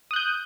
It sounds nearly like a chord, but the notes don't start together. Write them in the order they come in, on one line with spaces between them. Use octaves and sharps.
D#6 F#6 G6